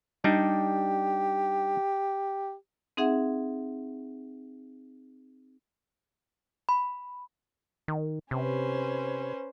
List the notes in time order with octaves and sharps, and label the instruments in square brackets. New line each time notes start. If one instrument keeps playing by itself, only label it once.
[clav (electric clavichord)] G3 D4 D#4 [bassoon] G4
[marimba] C4 D#4 G#4 E5 F#5
[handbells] B5
[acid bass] D#3
[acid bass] C3 [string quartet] C#4 B4 C5